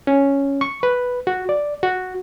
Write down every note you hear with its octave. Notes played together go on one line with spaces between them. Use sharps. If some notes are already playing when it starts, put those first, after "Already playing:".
C#4
C#6
B4
F#4
D5
F#4